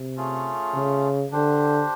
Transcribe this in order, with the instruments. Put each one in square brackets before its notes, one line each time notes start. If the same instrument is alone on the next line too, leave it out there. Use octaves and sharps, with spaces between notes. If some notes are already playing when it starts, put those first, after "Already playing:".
Already playing: [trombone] C3
[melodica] A3 C#4 F4 G#4
[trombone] C#3
[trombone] D3 [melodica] D4 G4 C5